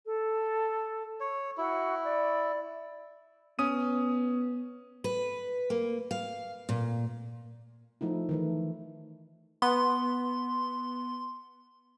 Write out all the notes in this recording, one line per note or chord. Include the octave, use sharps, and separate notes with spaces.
A4
C#5
E4 F#4
D5
B3 C#4 D#6 D#7
B4
A#3
F5
A#2
F3 A3 D#4 E4
D#3 E3 A3
B3 C6